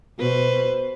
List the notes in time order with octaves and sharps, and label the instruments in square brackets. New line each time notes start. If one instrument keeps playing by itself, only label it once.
[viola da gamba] B2 B4 C5